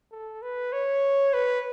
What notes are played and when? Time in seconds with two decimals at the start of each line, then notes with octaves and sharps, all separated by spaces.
0.12 A4
0.42 B4
0.73 C#5
1.34 B4